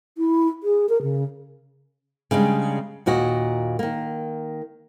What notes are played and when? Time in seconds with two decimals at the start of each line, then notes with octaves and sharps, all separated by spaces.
0.18 E4
0.63 G#4
0.89 A#4
1.02 C#3
2.31 C#3 G3 G#3 D4
3.06 D#2 A#2 F#4 D#5
3.79 D#3 A#3